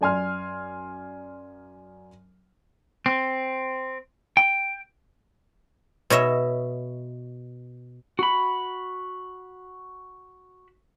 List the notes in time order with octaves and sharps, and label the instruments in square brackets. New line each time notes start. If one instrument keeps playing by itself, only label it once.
[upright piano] F#2 D5 G#5 C6 F6
[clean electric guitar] C4
G5
[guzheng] B2 C#5 D#5 E5
[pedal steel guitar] F#4 B5